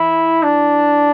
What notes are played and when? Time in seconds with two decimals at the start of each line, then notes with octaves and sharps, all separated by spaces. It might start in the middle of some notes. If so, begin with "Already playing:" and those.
Already playing: E3 E4
0.43 D4